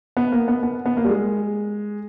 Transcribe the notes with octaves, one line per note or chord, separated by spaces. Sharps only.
B3
A#3
B3
B3
B3
A#3
G3
G#3